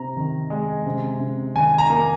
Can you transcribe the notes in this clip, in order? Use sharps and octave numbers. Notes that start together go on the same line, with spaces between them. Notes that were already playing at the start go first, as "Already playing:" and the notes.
Already playing: C3 C4 A#5
D#3
G#3
C3
C3
D#3 G#5
A#5
A#3